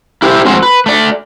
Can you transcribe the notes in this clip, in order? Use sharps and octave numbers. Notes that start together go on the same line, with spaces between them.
E4 G4 A#4 C5 E5
F2 G#3 C4 F#4 C5
B4
A3 D5